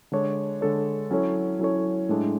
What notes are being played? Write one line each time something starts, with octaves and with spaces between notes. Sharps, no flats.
D3 G#3 D4 A4 C#5
D3 G#3 D4 A4 C#5
F#3 C#4 E4 A4 C#5
F#3 C#4 E4 A4 C#5
A2 G#3 D4 A4